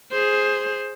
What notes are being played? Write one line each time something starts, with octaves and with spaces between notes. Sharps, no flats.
G#4 C5